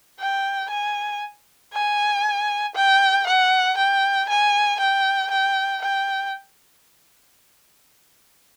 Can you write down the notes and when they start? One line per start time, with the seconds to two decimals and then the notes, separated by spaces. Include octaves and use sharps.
0.20 G5
0.70 G#5
1.74 G#5
2.75 G5
3.27 F#5
3.77 G5
4.29 G#5
4.80 G5
5.31 G5
5.82 G5